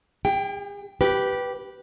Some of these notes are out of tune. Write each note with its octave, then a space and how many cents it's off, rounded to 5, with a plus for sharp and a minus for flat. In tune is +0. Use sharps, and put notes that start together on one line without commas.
G#4 -45 G5 +0
G4 -10 B4 -5